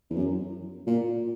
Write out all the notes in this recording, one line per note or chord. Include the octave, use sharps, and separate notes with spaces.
E2
F#2
A#2